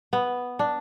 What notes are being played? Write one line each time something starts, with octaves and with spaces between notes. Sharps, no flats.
B3
D4